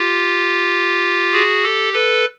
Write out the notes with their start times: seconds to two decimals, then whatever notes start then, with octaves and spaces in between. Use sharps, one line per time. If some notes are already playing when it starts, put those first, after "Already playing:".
Already playing: F4 G4
1.33 F#4 G#4
1.63 G4 A4
1.93 A4 B4